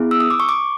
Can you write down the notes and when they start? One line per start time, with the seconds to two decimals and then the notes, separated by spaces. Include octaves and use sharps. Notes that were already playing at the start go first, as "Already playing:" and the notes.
Already playing: B3 E4 G#4
0.11 E6
0.20 D#6
0.31 D6
0.40 C#6
0.49 D6